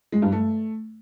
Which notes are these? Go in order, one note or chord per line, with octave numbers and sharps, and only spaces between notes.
G#3
G2
A3